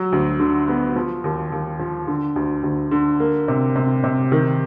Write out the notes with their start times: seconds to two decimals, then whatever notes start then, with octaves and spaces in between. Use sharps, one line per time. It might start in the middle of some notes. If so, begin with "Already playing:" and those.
Already playing: F#3
0.12 D2
0.40 D3
0.67 B3
0.96 F3
1.24 D#2
1.52 D#2
1.79 F3
2.07 D3
2.36 D2
2.63 D2
2.91 D3
3.20 A#3
3.48 C3
3.76 C3
4.04 C3
4.32 D#3